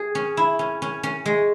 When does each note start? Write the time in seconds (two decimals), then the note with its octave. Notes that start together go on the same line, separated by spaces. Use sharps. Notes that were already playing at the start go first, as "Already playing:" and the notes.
Already playing: G#4
0.15 C#4
0.37 E4
0.59 C#4
0.82 C#4
1.03 C#4
1.26 G#3